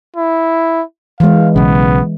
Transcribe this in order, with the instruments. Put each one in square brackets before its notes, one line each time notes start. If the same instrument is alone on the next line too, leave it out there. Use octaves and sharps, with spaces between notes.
[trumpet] E4
[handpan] E3 G#3 [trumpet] F5
[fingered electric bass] B1 C#3 [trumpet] B3